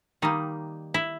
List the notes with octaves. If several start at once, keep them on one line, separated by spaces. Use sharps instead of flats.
D#3 G3 A#3 D#4
E4